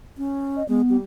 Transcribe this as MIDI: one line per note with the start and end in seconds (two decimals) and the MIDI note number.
0.18 0.63 61
0.56 0.64 75
0.68 0.81 56
0.68 0.96 59
0.89 1.04 55